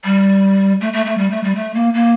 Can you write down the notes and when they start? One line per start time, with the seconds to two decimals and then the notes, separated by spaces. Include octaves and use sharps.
0.05 G3
0.81 A3
0.93 A3
1.06 A3
1.18 G3
1.30 A3
1.44 G3
1.55 A3
1.74 A#3
1.94 A#3